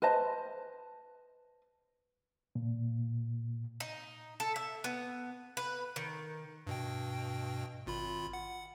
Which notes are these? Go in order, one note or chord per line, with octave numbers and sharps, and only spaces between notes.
B4 C5 D#5 A5
A#2
D#4
A4
E5
B3
B4
D#3
G2 B2 G5
G#1 F4 B5
F#5